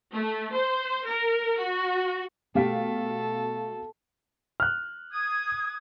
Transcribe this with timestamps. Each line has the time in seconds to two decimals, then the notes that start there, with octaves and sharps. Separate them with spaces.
0.13 A3
0.53 C5
1.06 A#4
1.60 F#4
2.55 B2 A3 F#4 G4 A4 F5 B6
4.60 F6 F#6
5.12 D#6 G#6